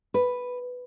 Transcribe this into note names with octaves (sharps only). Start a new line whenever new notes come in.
B4